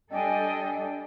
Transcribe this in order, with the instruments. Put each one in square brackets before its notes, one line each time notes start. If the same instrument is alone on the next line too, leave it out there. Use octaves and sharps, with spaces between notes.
[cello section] G3 D4 A4 [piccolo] D#5 [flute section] G5 G#5